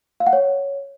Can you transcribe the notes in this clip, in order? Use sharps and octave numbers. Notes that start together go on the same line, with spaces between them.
F5
F#5
C#5